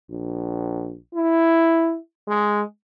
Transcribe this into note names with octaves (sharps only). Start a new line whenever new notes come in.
A#1
E4
G#3